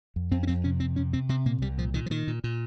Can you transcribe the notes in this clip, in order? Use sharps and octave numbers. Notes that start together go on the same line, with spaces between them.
F2
F2 C4
C#4
F2 C4
C3 C#4
F2 C4
C3 C#4
C3 C4
C3 C4
A#2 A#3
C2 G3
A#2 F3
A#2 D#3
F3
A#2 D#3
A#2
A#2